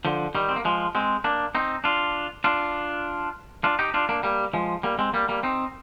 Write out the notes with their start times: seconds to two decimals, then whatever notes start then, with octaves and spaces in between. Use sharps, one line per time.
0.05 D3 F3
0.35 D#3 G3
0.49 C4
0.56 A#3
0.65 F3 G#3
0.95 G#3 C4
1.24 A#3 D4
1.55 C4 D#4
1.84 D4 F4
2.44 D4 F4
3.64 D4 F4
3.79 D#4 G4
3.94 D4 F4
4.09 A#3 D4
4.23 G3 A#3
4.53 F3 G#3
4.83 G3 A#3
4.99 G#3 C4
5.13 G3 A#3
5.28 G3 A#3
5.43 C4 D#4